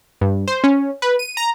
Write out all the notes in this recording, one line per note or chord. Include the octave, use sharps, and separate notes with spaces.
G2
C5
C#4
B4
D#7
A#5